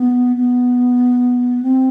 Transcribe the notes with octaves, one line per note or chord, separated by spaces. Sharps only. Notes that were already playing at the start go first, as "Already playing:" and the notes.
Already playing: B3
B3
C4